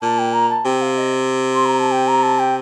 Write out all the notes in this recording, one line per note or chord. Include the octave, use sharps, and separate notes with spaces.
A#2 A5
G5
A#5
A5
C3 G5
F5
D#5
C6
A#5
A5
G5
A#5
A5
G5